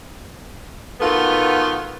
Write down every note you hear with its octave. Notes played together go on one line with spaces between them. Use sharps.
D#3 A3 B3 F4 F#4 A4